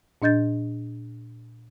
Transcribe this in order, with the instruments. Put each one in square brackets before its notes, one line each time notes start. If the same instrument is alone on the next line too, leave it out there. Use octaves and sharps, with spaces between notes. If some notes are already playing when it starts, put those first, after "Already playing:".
[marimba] A#2 D4 D#5 G6 A6